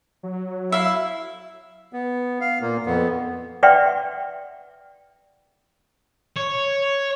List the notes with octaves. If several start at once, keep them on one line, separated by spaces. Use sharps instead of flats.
F#3
E4 E5 F5
B3
F5
A#2 A#3
F2 B3
B4 D5 E5 F#5 G5 C6
C#5